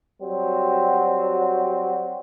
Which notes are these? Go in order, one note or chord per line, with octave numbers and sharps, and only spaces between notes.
F#3 G3 C4 F#4